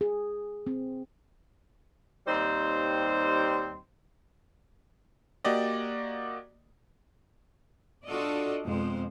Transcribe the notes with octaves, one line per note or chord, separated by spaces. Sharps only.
G#4
C4
D#2 G3 C4 D#4 C5
A#3 F#4 G4 D5 D#5
D4 F4 F#4 A4 D5 D#5
F2 B2 G#3 C5